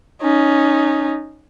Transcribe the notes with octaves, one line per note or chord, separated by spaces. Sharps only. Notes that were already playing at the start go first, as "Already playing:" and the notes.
C#4 D#4